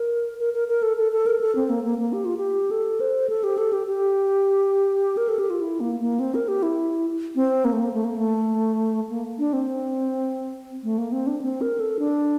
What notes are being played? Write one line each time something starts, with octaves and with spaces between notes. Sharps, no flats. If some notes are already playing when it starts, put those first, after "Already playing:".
Already playing: A#4
A#4
A#4
A#4
A4
A4
A4
A#4
A4
C4
A#3
A#3
A#3
G4
F4
G4
A4
C5
A4
G4
A4
G4
G4
A#4
A4
G4
F4
E4
A#3
A#3
C4
A#4
G4
E4
C4
A#3
A3
A#3
A3
A#3
A3
A#3
D4
C4
A3
A#3
C4
D4
C4
A#4
A4
D4